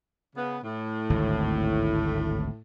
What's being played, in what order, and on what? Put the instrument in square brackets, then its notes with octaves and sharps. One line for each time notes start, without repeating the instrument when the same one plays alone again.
[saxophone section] C#3 B3
A2
[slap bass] G#1 D2